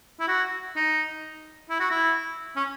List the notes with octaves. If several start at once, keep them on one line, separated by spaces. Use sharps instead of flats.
E4
F#4
D#4
E4
F#4
E4
C#4